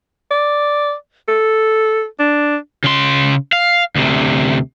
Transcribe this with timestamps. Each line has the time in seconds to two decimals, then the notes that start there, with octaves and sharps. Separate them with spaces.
0.31 D5
1.28 A4
2.19 D4
2.84 C#3 C6
3.53 F5
3.96 D2 C3